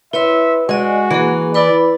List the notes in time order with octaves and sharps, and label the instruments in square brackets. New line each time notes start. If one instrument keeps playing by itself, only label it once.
[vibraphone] E4 C#5 C6 [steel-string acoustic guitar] B4 [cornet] E5
[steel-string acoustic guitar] G#3 [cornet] F#4 [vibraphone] D5 D#5 G#5
[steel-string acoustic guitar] E3 [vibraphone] A#3 G#4
[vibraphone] E4 B4 B5 [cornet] D5